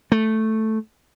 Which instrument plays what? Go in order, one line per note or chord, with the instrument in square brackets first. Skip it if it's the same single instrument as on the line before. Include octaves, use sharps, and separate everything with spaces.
[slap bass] A3